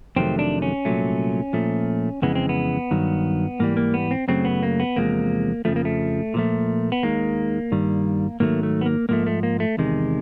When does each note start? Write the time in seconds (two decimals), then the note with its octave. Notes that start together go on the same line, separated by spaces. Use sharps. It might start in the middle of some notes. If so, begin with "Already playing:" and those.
0.16 F2 C3 D#3 F#3 A3 C4
0.39 D4
0.62 C#4
0.85 C2 A#2 F#3 A3
1.53 A#2 F3 A3
2.22 F2 C#3 E3 G#3 B3
2.35 C4
2.49 B3
2.91 G2 D#3 F#3
3.59 G#2 E3 G3 A#3
3.77 A#3
3.94 B3
4.11 C4
4.28 F#2 C#3 F#3 A3 C4
4.45 B3
4.63 A#3
4.80 B3
4.96 E2 C3 F3 G#3 A#3
5.65 F2 C#3 F3 A3
5.76 A#3
5.85 A3
6.34 A#2 F3 A3
6.92 B3
7.03 D#2 D#3 G#3 A#3
7.72 G2 D#3 G3
8.40 G#2 D#3 F#3 A3 A#3
8.63 A3
8.81 B3
8.86 A#3
9.09 G#2 F3 A3 A#3
9.27 A3
9.43 A#3
9.60 A3
9.77 E2 C3 D#3 G#3